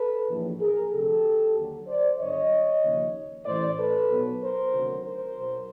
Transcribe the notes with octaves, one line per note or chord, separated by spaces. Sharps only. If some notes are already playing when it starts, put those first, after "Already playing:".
Already playing: A4 B4
A#1 A2 E3
G#4 A#4
D2 C3 F3 G4 A4
D#2 D3 F#3
C5 D5
G1 G2 D3 F#3 C#5 D#5
D#2 C#3 F3
A1 A2 E3 C5 D5
A4 B4
B1 B2 F#3
A#4 C5
D2 C3 D#3 F#3
A#4 C5
B1 B2 F#3